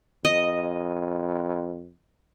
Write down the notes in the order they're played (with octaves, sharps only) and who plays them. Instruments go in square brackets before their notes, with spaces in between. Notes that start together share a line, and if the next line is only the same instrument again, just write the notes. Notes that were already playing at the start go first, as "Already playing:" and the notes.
[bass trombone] F2 [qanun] D#5